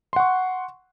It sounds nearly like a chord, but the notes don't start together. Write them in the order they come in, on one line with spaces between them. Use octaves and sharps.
C6 F#5 C#6